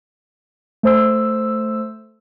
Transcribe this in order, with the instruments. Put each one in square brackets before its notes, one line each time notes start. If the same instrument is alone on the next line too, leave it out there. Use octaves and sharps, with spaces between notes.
[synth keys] A3 C5 E6